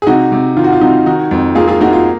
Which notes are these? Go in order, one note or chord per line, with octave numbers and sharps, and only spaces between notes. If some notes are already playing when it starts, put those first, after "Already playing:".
G#4
C3 D#4 F#4
C3
D#3 F4
F#4
F4
C3 D#4 F#4
D#3 D#4 F#4
F2
A#3 F4 G#4
F4 G#4
A#3 D#4 F#4
F4